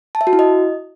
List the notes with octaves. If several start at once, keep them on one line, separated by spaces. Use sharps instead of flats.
A5
E5
F#4
E4
D#5